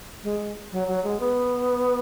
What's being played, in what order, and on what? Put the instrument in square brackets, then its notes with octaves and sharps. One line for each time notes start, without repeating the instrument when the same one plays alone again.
[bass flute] G#3
F#3
F#3
G#3
B3